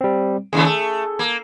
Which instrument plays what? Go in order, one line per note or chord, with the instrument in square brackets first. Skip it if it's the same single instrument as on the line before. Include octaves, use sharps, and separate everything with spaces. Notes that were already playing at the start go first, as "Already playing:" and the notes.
[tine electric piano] G3 C4
[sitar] D#2 C#3 A3 [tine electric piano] G#4
[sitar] A3
A#3